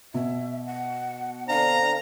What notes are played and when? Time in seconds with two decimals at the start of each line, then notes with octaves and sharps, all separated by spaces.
0.14 B2 E5
0.67 F#5
1.49 D3 C4 D4 F5 A#5